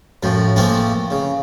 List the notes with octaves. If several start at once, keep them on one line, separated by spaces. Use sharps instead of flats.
F#2 A2 F3
E3 F3 A3 A#3 C4
C#3